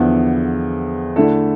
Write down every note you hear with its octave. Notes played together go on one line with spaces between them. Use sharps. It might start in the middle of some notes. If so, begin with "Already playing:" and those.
Already playing: E2 D3 F3 B3 E4
D3 A3 E4 A4